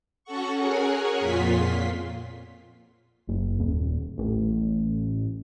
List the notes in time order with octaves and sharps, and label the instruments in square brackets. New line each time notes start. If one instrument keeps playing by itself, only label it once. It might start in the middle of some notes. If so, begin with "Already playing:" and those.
[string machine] C#4 F#4 A4 F#5 C#6
G#4 A#4 C#5 F#5 G#5
F2 A#2 F4 C6 B6
[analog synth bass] F#1
D#1
A1